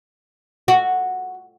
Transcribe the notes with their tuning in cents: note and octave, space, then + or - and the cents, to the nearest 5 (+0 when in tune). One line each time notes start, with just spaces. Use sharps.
F#4 -5